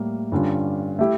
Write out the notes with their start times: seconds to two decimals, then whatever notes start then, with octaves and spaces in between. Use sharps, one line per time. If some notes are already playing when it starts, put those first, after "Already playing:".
Already playing: A2 G3 A#3
0.32 G2 D3 G3 C#4 F4
0.99 A3 E4 G4